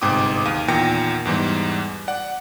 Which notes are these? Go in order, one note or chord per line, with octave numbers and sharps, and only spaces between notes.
G1 G#2 C3 G5 D6 D#6
D#2 F5 D#7
E2 A#2 D#3 G5 A#6 C#7
E2 G#2 E3 G3
D5 F#5